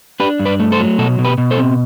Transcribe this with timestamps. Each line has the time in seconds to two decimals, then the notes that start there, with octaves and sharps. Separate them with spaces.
0.20 D4 G4 B4
0.39 G2
0.46 B4 D5
0.60 A3
0.72 A4 C5
0.79 F#3
0.98 B2 F#4 A4
1.19 B2
1.24 G4 B4
1.38 B2
1.51 A4 C5
1.58 C4